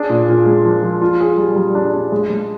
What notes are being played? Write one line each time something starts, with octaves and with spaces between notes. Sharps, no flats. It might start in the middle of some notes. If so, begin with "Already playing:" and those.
Already playing: D4 G#4
A#2
A#2
G#3
F3
F3
F4
G#4
G3
G3
D4
D4
G#3
G#3